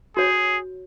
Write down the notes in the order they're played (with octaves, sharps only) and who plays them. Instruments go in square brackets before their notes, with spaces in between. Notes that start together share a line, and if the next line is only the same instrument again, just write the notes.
[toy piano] F#4 C#5 [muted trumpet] G#4